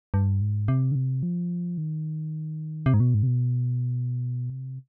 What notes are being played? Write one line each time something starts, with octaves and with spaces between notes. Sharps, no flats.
G2
G#2
C3
D3
C3
F3
D#3
C3
G#2
B2
G#2
C3
B2
C3